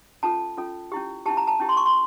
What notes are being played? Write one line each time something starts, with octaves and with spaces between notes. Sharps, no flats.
C#4 F4 A4 A5
C#4 F4 A4
C#4 E4 G4
C#4 E4 G4 A5
A#5
A5
C#4 E4 G4
C6
C#6
C6